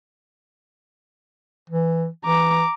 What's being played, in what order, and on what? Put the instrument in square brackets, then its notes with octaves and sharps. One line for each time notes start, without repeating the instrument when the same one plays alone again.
[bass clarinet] E3
[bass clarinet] E3 [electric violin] A#5 D6